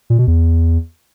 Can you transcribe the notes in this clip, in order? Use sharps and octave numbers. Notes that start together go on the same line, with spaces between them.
A#2
B2
E2